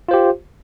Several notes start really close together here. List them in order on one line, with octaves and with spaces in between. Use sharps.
F4 C5 G4